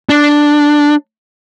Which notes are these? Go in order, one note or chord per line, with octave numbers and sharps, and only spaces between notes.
D4